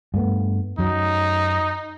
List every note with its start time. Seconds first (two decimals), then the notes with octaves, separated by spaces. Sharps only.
0.14 G2 A3 B3
0.79 F#2 F#3 D#4